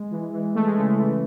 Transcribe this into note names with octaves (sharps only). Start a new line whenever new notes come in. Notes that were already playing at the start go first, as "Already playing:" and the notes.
Already playing: G#3
E3
E3
E3 A3
G#3
C#3 A3
G#3
E3 A3